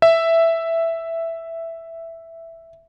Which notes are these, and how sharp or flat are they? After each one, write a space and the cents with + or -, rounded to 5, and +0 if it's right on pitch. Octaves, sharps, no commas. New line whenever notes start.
E5 +5